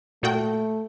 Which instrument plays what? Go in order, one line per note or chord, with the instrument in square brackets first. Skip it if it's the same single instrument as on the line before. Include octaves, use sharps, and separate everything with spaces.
[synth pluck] A#2 F#4 G5 [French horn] A3